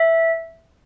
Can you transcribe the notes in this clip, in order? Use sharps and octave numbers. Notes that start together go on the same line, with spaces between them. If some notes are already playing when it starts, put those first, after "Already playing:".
Already playing: E5